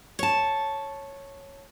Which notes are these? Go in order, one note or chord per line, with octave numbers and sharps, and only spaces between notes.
C#5 A5